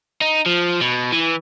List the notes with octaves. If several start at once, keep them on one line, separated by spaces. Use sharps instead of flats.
D#4
F3
B2
E3